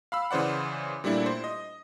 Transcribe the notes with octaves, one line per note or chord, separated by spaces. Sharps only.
F5 B5 E6
C#3 E3 C5 D5 F#5
A#2 G3 A3 D4 E4
C5
D#5